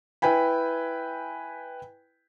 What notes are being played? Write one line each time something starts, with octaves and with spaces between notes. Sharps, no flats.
E4 B4 G5 G#5 B5